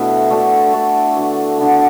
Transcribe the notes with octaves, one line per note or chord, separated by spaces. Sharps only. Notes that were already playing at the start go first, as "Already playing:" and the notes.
Already playing: B2 A3 B3 D4 E4
A3 D4 F#4 A4
A3 D4 F#4 A4
D3 B3 F#4
D3 B3 F#4